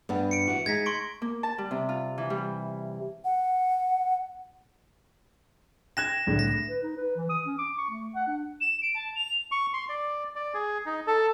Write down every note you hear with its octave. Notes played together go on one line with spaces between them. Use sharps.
G2 B3 D4
C#7 D7
E3 F#4
G#3 D#4 G#6 A#6 B6
C6 C#6 D7
A#3
A5
G3
C3
F4
E3
G3
F#5
G5 F#6 G#6 A#6 E7
C2 A2 D3
A#6
B4
D#4
B4
E3
D#6
C#4
D6
C#6
A3
F#5
D4
E7
D7
A5
F7
C#6
C6
D5
D5
G#4
D#4
A4